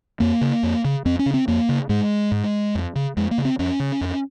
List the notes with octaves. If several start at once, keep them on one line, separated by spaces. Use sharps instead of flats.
F2 A#3
C#3
F2
C#3
F2 C4
C#4
C#3
C4
F2 A#3
C#3
G#2 G#3
G#2
F2
C#3
F2 G#3
A#3
C#3
C4
F2 C#4
C#3
F2